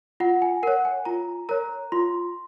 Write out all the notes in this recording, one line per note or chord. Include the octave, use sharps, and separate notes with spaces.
F4 F#5
G#5
A#4 C#5 F#5
G#5
F4 A#5
A#4 C#5 A#5
F4 C6